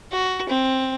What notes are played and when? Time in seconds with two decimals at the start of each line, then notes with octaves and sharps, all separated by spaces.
0.12 F#4
0.49 C4